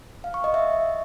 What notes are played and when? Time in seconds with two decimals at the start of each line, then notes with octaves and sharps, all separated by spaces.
0.24 F5
0.34 C#6
0.44 D#5
0.54 E5